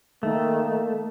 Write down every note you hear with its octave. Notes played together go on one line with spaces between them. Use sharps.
D#3 A3 A#3